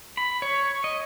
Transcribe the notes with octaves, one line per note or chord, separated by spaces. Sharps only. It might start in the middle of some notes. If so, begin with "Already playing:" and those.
B5
C#5
D#5